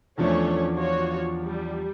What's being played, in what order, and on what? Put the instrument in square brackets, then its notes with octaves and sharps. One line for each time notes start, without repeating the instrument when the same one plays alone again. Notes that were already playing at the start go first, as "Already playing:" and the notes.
[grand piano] E2 F3 D4 [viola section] A3 C#4 C#5
[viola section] F4 F#4 C#5
G3